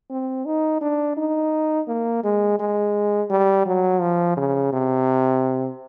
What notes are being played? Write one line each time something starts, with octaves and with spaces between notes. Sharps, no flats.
C4
D#4
D4
D#4
A#3
G#3
G#3
G3
F#3
F3
C#3
C3